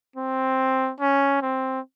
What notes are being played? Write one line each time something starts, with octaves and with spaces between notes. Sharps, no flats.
C4
C#4
C4